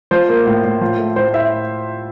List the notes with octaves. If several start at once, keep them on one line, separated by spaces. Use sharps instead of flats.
F3 C5
A#3
A2
A2
F3
A3
A2 C5
E4 E5